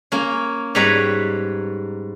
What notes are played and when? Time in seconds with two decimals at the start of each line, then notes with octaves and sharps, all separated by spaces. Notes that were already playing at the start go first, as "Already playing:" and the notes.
0.12 A#3 C#4
0.75 G#2 G3 B4 C#5 A#5 B5